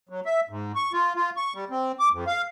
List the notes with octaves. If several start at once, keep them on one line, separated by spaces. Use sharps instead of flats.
F#3
E5
G#2
C#6
F4
F4
C#6
G3
C4
D6
F2
F5